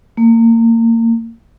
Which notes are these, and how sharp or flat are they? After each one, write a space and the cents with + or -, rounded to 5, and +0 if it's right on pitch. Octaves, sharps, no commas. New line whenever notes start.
A#3 -30